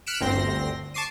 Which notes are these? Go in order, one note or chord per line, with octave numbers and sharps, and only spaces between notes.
F6 F#6 B6 C#7 D7 E7
G1 D2 C4 C6 A#6
A5 C#6 D6 C7 D#7